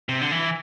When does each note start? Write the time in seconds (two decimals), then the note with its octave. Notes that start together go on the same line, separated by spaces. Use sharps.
0.09 C3
0.21 D3
0.31 E3